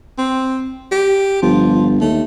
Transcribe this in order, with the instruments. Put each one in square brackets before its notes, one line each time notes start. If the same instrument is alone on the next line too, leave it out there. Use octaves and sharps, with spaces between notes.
[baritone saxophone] C4
G4
[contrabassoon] G1 [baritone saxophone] F3
[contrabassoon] D#2 [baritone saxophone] A3